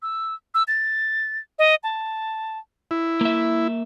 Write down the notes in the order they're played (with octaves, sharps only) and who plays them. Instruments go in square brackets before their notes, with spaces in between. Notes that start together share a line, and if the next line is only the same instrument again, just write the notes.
[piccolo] E6
E6
A6
D#5
A5
[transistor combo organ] E4
[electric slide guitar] A#3 E5